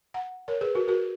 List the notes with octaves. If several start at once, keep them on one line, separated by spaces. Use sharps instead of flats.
F#5 A#5
A#4 C#5
G#4 B4
F#4 A#4
F#4 A#4